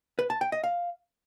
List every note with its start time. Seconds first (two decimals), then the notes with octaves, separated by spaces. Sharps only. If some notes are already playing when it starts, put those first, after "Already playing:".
0.19 B4
0.30 A5
0.41 G5
0.52 D#5
0.64 F5